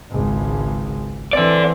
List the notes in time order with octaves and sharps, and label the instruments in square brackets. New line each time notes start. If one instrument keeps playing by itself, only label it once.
[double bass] G#1 C#2
[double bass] E3 C4 [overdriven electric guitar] A4 D5